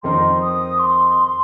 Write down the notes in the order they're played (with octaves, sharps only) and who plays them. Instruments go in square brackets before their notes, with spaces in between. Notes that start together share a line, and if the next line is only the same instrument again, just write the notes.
[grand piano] F2 D#3 C4 D#4 A#4 [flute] C6
[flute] D#6
C6